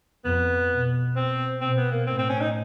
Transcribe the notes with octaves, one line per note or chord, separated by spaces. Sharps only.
F2 B3
B2
C4
B2 C4
B3
A#3
A2 C4
C4
C#4
D#4